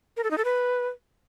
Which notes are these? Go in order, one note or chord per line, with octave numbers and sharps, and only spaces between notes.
A#4
A4
D#4
A4
B4